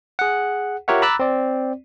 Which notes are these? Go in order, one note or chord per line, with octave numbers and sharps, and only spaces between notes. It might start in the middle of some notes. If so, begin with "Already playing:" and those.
G#4 F#5
F4 G4 A#4 C#5 E5 F#5
A#5 B5 D6 E6 F#6 A6
C4 D5